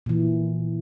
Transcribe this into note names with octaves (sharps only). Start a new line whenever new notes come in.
A#2 E3